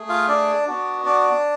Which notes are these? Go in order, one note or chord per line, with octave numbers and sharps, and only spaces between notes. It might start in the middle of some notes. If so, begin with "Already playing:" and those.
Already playing: A3 G#4
F4 F5
D4 D5
B3 D4 F#4
D4 D5